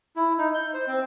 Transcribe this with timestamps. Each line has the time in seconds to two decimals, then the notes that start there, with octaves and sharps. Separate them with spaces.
0.16 E4
0.38 D#4
0.54 G6
0.74 C5
0.87 C4